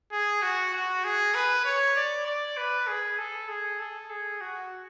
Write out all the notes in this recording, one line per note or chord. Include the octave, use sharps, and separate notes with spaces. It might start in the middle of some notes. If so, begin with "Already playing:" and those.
G#4
F#4
F#4
G#4
B4
C#5
D5
D5
B4
G#4
A4
G#4
A4
G#4
F#4